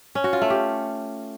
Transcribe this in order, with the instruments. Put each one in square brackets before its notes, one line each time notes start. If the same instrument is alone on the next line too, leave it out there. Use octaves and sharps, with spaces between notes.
[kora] C#4
F#4
F4
A3
G4